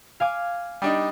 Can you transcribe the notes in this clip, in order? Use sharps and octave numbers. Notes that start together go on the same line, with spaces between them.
F5 G#5 D6
G3 D4 D#4 D#6